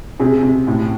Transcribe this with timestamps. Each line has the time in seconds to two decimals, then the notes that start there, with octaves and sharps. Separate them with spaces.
0.19 C3 G#4
0.43 C3
0.67 A2